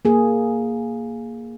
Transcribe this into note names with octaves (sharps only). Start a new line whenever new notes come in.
A#3 G#4